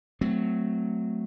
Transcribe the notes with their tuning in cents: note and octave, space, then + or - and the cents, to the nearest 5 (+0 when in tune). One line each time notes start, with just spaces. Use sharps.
F#3 +0 A3 +0 C4 -15